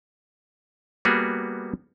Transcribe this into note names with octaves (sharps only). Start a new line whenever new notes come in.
G3 A#3 B3 F#4 G#4